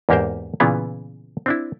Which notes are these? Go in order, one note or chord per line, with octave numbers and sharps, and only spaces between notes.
E2 G#2 A#3 G4 A#4 C5
A#2 C#3 E3 B3 E4 F4
C4 D4 E4